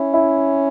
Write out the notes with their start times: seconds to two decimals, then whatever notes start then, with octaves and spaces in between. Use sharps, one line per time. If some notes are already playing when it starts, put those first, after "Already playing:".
Already playing: C#4 E4
0.14 E4